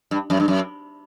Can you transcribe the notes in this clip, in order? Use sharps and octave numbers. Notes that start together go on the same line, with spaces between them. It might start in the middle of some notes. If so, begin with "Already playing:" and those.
G2
F#2
G2
F#2